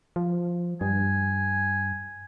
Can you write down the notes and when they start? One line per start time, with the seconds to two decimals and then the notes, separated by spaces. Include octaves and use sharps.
0.16 F3
0.81 G2 G#5